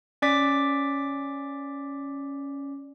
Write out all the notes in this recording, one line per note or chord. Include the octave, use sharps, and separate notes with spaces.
C#4 D5 D6 B6